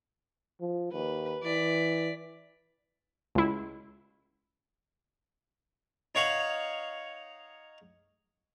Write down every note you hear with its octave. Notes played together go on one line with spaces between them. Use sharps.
F3
D#2 B4
E3 D5 B6
C#2 E4
D#4 C#5 F5 F#5 C#6